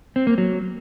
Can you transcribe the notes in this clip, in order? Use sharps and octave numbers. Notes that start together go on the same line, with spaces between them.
C4
A#3
F#3